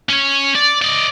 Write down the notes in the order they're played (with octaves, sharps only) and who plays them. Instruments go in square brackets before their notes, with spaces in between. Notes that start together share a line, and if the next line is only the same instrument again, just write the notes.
[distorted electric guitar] C#4 C#5
D5
D5 D#5